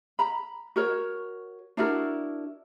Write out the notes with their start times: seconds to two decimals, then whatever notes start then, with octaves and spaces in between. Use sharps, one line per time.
0.19 A#5 B5
0.76 F#4 A#4 C#5
1.77 D4 E4 F#4 A#4